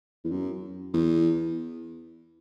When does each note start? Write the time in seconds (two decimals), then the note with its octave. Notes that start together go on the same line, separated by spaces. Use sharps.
0.24 E2
0.31 F#2
0.93 E2